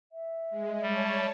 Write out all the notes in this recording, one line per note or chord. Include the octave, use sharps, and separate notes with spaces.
E5
G#3
G3 C#5 A5